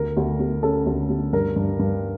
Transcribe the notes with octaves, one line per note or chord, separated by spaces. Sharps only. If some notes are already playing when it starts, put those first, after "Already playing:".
Already playing: D2 A#4
D2
D2
C#4 A4
D2
D2
G2 A#4
G2
G2